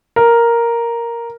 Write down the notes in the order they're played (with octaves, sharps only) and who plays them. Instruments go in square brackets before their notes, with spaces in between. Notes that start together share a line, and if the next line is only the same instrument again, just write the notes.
[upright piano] A#4